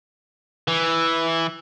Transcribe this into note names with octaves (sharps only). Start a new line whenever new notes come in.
E3